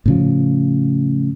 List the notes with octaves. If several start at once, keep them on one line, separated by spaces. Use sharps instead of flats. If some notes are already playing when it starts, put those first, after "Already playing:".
A2 C#3 F3